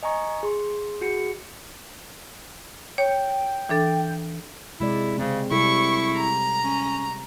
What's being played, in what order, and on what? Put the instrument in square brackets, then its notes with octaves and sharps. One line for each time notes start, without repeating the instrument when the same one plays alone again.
[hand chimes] D#5 G#5 A#5 C#6
G#4 C6
F#4 G#4 C#7
[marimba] C#5 [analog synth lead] G5
[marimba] E3 D4 A4
[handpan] C3 G#3 D5 [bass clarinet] E4
[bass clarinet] C#3 [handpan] G#3 C4
[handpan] C3 G3 A4 [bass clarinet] E4 [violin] C#6
[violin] A#5
[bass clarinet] C#4